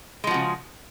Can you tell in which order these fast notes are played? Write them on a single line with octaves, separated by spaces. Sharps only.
G#3 F3 F#4 C#3